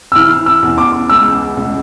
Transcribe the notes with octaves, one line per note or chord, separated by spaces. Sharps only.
E6
E3 F6
E6
E2
D6
C#2 E6
C#2